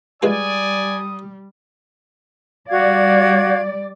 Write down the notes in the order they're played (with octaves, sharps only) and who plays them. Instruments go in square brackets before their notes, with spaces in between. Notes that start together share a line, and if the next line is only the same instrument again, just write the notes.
[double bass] G3 [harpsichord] G#3 F4 B4 [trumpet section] D5 G#5 [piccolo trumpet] D#6
[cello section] G3 D5 [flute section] F#4 F5 G#6